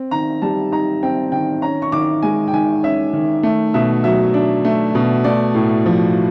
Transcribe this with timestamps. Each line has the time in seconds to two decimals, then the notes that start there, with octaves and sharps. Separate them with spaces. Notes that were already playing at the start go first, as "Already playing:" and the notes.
Already playing: C4
0.11 D#3 A#5
0.42 G3 A5
0.71 D#4 A#5
1.03 C4 G5
1.32 D#3 G5
1.62 C#4 A#5
1.82 C#6
1.92 D#3 D6
2.23 G#3 G#5
2.48 G5
2.53 D#3 G#5
2.83 C#4 E5
3.13 D#3
3.43 A3
3.74 B2 E5
4.04 F#3 E5
4.34 D4
4.65 A3
4.95 B2
5.24 A3 D5
5.55 A2
5.86 F3